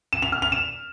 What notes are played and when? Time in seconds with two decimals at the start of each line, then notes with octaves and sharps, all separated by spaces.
0.13 E7
0.22 F7
0.32 F6
0.42 F7
0.52 E7